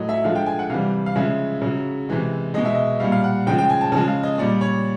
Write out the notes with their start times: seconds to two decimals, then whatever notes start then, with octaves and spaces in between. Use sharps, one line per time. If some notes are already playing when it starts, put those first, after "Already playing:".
Already playing: A2 F#3 D#5
0.09 E5
0.24 D3 F3 G#3 F5
0.35 G5
0.46 G#5
0.59 F#5
0.70 C3 E3 G3 F5
1.06 F5
1.16 C#3 F3 G#3 E5
1.62 C#3 F#3
2.09 C3 E3 G#3
2.54 B2 G#3 D#5
2.65 E5
2.75 D#5
3.00 A#2 G3 F5
3.12 F5
3.24 F#5
3.47 C#3 F3 G#3 G5
3.58 G5
3.70 G#5
3.81 A5
3.92 C#3 F3 G#3 A5
4.08 F5
4.23 D#5
4.38 A#2 G3 D5
4.61 C#5